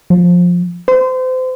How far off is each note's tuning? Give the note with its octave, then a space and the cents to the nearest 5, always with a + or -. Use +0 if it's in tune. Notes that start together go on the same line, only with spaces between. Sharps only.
F3 +15
C5 -30